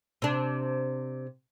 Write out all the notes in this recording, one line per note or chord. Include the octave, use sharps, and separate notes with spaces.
C3 D4